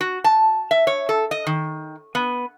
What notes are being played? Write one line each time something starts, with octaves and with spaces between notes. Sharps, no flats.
F#4
A5
E5
C#5
A4
D#5
D#3
B3